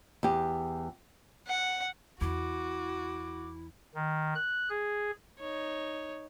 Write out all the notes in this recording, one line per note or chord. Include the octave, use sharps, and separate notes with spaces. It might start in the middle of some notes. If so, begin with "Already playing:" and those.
E2 G4
F#5
E2 E4 F#4 D6
D#3
F#6
G#4
D#4 C#5